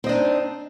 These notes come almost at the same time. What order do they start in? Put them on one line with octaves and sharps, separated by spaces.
C4 D#5 D4 D#4